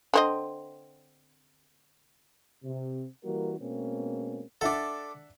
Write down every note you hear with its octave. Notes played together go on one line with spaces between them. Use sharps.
D3 C4 D#5
C3
E3 G3 A#3 F#4 A#4
B2 G#3 A#3 C4 C#4
D4 A4 D5 E5 F#5